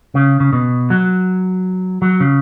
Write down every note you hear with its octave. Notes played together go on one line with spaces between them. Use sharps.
C#3
C#3
B2
F#3
F#3
C#3